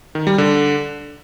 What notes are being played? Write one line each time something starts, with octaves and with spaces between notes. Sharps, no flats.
D#3
G3
D3